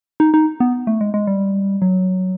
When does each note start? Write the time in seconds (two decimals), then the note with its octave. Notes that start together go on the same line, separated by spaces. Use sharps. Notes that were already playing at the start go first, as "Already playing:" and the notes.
0.20 D#4
0.34 D#4
0.60 B3
0.87 A3
1.01 G#3
1.14 G#3
1.27 G3
1.82 F#3